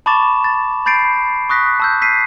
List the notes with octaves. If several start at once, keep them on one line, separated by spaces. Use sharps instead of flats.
A5 B5 C#6 D6 A6 E7
A6
B5 G6 A6 C7 D7
C#6 D#6 F#6 A#6 B6
A5 E6 G6
E6 B6 C7 D#7